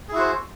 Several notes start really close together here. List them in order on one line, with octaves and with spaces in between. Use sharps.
G#4 E4 F#4 C5